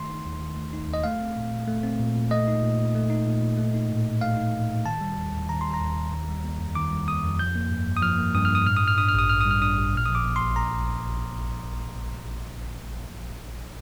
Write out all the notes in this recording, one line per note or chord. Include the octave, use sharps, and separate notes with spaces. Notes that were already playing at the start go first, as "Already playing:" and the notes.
Already playing: D#3 A3 C6
D#4
D#2
D#3
A3
D#4
D#2
D#5
A3 F5
C4
A#2
A#2
A3
C4
A#2
A#2
A3 D#5
D#4
A#2
A#2
A3
D#4
A#2
A#2
A3
D#4
A2
A2
A3 F5
D#4
A2
A2
D#3 A5
G3
D#2
D#2
D#3 A#5
G3 C6
A#5
D#2
D#2
D#3
G3
A#3
F2
D#3 D6
G3
A#3 D#6
F2
F3 G6
A#3
G2
G2
D#6
F3 F6
A#3
G2 D#6
G2 F6
D#6
A2 F6
G3 D#6
F6
D4 D#6
F6
A1 D#6
A2 F6
G3 D#6
F6
D4 D#6
A1
A#2 F6
F3 D#6
D6
A#3
A#1 C6
A#2 A#5